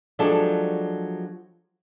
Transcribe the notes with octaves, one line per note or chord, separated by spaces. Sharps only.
F3 F#3 G#3 D4 G4 A4